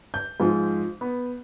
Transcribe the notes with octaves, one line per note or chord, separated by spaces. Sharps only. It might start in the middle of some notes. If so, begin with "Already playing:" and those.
G6
G#2 F3
B3